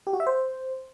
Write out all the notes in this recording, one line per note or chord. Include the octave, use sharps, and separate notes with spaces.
G4
F#4
E5
C5